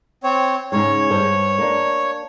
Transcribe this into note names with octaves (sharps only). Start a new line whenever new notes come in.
C4 C#5
G#2 C#3 G#3 C#5
G2 C5
A#3 D4